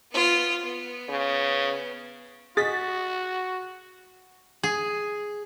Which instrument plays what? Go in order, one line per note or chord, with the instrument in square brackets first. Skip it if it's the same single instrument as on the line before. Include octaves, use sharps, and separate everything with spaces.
[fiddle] B3 F4
B3
[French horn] C#3
[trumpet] F#4 [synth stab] G#4 D#5 B6 [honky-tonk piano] A6
[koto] G#4